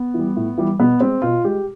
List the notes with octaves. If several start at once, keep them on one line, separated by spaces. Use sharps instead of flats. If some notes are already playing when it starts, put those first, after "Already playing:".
Already playing: B3
E3
G3
A2
E3 G3
B2 B3
G#3 C4
B2 F4
G#3 G4